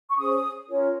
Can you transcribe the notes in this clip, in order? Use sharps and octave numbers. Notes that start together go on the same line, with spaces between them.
C#6
C#4 G#4 C5 D#6
C#4 F4 A#4 C#5